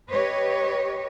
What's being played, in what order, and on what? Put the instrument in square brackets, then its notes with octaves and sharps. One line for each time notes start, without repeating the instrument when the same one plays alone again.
[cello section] G4 B4 C#5 D#5